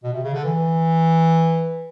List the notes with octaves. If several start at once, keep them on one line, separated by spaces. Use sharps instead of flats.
B2
C3
C#3
D3
E3